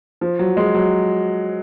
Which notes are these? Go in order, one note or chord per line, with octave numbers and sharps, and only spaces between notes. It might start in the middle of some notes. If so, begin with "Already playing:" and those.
F3
F#3
G#3
F#3